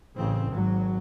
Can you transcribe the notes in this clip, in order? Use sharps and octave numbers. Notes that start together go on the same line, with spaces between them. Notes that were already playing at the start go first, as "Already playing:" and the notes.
A1 C#3 C4
G#1 F#3